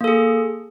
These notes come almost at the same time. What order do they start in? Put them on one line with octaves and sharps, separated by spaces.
A#3 A4 G#4